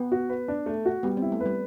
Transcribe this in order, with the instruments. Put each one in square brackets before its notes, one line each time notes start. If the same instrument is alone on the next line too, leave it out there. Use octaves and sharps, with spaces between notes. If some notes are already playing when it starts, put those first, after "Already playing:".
Already playing: [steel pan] B3
[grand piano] F#4
B4
D4
A3
F#4
[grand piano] G3 [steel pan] B3
[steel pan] C4
[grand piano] E4
[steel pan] A3
[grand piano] B4
[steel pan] G3